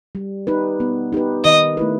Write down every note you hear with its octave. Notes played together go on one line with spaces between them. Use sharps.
G3
D#4 G4 B4
B3
D#4 G4 B4
D#3 D#5
A3 E4 B4